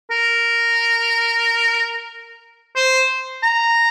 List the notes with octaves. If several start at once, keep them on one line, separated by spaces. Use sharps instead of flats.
A#4
C5
A#5